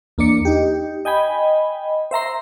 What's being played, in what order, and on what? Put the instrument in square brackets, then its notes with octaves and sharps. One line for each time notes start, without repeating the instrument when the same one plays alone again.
[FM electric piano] E2 A#3 D4 D5 C#7
D#4 G4
D#5 G5 G#5 B5
C5 E5 A#5 C6